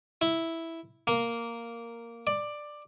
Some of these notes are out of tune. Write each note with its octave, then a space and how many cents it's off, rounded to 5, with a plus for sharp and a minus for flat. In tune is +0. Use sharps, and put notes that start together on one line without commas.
E4 -5
A#3 -5
D5 +10